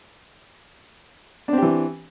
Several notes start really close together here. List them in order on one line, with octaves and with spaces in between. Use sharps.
D4 C4 G4 E3